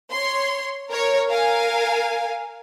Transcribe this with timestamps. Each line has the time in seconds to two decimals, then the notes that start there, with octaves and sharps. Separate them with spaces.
0.11 C#5 C6
0.90 A#4 C#5
1.29 A#4 F5 G#5